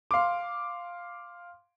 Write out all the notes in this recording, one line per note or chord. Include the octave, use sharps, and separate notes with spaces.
F5 C6 D6